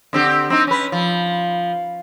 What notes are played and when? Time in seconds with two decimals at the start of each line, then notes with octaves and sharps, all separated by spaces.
0.13 D3 C4 G4
0.50 C4 D#4
0.67 C#4 B4
0.92 F3